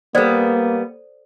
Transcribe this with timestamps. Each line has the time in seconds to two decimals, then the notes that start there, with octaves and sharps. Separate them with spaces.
0.15 G3 A#3 B3 A4 C5 D5